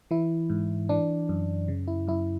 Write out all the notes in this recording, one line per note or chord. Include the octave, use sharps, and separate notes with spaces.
E3 E4
G#2
E3 D4
F#2
C#3
E4
F#2 E4